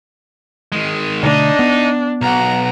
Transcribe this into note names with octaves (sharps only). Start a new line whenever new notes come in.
D#3 G#3
B2 D3 A3 D4 D#4
B3
B1 F#5 A#5